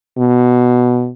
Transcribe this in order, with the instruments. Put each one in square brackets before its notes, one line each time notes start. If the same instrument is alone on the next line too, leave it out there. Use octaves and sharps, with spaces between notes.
[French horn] B2